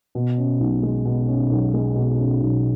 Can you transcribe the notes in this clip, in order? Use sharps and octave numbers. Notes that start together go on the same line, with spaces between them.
B2
C#4
B1
G#3
B2
C#4
B1
G#3
B2
C#4
B1